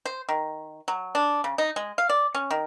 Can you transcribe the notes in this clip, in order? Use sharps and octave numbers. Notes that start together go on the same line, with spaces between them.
C5
D#3
F#3
D4
C#3
D#4
G#3
F5
D5
C#4
D#3